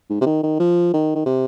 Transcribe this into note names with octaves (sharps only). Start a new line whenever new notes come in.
G#2
C3
D#3
D#3
F3
D#3
D#3
C3